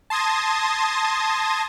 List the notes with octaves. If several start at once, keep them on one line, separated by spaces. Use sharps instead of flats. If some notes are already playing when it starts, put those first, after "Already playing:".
A5 C6 D#6 G#6 A#6